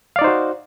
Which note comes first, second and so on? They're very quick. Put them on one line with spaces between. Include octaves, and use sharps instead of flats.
F5 D5 D#4 C5 F#4